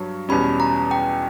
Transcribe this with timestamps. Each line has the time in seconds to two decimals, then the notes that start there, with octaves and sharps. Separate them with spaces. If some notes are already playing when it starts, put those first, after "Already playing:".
Already playing: G2 F#3 C#5
0.29 E2 B2 G3 C#4 B5
0.60 A#5
0.91 G5